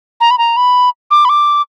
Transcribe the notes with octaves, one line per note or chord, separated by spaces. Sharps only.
A#5
B5
A#5
B5
D6
B5
D6